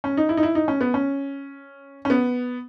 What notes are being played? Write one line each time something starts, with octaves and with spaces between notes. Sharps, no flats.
C#4
D#4
E4
D#4
E4
D#4
C#4
B3
C#4
C#4
B3